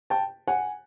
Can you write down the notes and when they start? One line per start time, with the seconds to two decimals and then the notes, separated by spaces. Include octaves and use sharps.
0.10 G5 A5
0.47 F#5 G#5